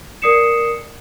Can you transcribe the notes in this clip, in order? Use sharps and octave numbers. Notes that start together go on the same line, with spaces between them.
A#4 D5 D#6 C7 C#7 E7